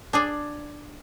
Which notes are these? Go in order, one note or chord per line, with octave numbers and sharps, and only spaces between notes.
D4 G#4 D5